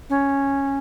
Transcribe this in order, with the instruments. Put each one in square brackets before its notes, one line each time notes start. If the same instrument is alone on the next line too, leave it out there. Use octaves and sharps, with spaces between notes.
[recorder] C#4